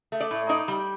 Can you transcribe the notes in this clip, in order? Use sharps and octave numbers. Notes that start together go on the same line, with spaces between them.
A3
D5
A2
D#4 D5
G3